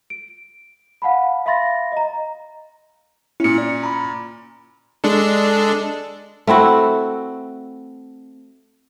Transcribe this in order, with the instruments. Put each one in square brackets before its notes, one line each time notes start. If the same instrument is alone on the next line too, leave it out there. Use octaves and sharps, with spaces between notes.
[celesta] D7
F5 F#5 A5 B5
E5 F5 B5 C6 A6 A#6
D#5 A#5
[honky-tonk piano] A#2 C#4 [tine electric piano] E4 C#7
[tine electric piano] D5
A#5 B5
[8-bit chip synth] G#3 D4 A4
[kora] A3 C4 E4 F#4